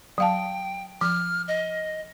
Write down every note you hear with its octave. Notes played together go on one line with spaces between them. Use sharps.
F#3 F5 G5 A5
F3 F6
D#5